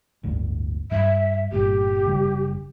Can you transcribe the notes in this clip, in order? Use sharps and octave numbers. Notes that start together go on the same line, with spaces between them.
G1 D2 A2
G2 G3 E5
G1 A#2 G4
F#1 C#3 G3